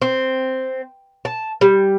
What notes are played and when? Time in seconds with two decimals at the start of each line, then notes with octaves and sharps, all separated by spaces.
0.02 C4
1.25 A5
1.61 G3